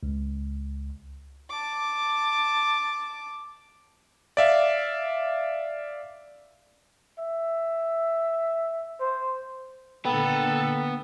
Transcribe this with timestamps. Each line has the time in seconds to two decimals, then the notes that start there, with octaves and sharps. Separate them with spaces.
0.03 C#2
1.50 A5 D6
4.37 D5 E5 F5
7.19 E5
9.00 C5
10.05 A#2 D3 A#3 B3 A4 G5 B5